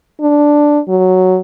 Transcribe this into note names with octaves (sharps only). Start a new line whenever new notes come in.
D4
F#3